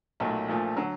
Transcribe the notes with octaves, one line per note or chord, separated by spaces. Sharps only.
B1 A#2 F#3 A3
A#1 A#2 F3 A3
D3 F#3